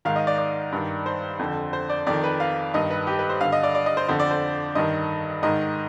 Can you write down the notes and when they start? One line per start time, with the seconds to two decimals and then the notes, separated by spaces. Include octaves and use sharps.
0.05 G#2 D#3 F5
0.16 D#5
0.27 D5
0.38 D5
0.72 G2 D#3
1.06 C5
1.39 F2 D3
1.73 C5
1.90 D5
2.07 F2 D#3 D5
2.24 B4
2.40 F5
2.74 G2 D#3 D#5
2.91 B4
3.07 G4
3.19 B4
3.30 C5
3.41 G2 D3 F5
3.52 D#5
3.63 D5
3.75 D5
3.86 D#5
3.97 C5
4.08 F2 D3 C5
4.20 D5
4.31 C5
4.75 G2 D#3 D#5
5.43 G#2 D#3 D#5